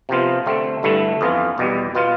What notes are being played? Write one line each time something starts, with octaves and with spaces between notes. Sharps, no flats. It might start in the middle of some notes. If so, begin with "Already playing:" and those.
C3 F3 B3 F4
D3 A3 C4
G2 D3 A3 E4
F2 E3 B3 F4
E2 B2 G3
B2 B3 F4